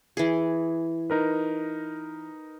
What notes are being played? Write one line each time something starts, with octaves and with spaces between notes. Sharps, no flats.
E3 G#4
D#4 A#4 B4